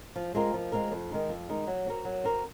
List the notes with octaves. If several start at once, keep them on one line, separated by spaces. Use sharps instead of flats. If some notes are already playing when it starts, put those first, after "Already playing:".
F3
G#3 C4 F4 A#4
F3
G#3 C4 F4 A#4
F2
D#3 G#3 D#4
F2
D#3 G#3 D#4
F#3
C4 F#4 A#4
F#3
C4 F#4 A#4